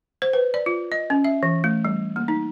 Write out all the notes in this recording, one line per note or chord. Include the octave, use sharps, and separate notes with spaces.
C5
B4
D5
F4
D#5
C#4
E5
E3
A3
G3
A#3
D#4